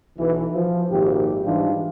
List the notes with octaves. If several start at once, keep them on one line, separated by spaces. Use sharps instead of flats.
B1 E3
F3
G#1 A#2 F3 G4
G#2 E3 G3 D4 F4